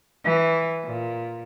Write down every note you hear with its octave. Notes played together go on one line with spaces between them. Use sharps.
E3
A#2